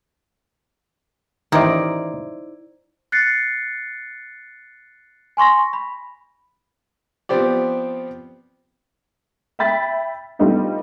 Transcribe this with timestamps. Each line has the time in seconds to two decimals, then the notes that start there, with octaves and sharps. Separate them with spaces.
1.52 A1 D#3 D#4 E4 C5 D5
3.12 F#6 A6 C7 C#7
5.37 G#5 C6 C#6 A#6
5.73 B5
7.29 F3 B3 C4 G4 D5
9.59 E5 G5 B5 A6 B6
10.39 G3 A3 B3 D#4 F4